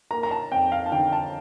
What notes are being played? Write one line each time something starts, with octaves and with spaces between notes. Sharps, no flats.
A#3 A#5
A#5
A5
F2 G5
F5
A5
D3 G5
A5